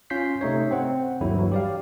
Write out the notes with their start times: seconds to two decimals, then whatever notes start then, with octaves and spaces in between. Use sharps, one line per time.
0.10 C#4 F4 C6 G6 B6 C7
0.41 C3 A3 D#4 C#5
0.71 C4 C5 F#5
1.20 G1 D#2 D3 F#3 E4
1.34 G2 E3 F#3
1.52 G4 D5 F5